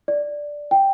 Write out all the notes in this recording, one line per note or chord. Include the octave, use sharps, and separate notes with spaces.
D5
G5